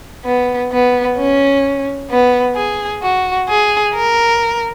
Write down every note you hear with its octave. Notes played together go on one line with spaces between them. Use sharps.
B3
B3
C#4
B3
G#4
F#4
G#4
A#4